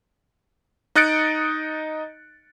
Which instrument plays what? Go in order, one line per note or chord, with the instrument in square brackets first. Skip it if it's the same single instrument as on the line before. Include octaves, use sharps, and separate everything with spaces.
[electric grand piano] D#4 D#5 F#6 A6 C#7 D7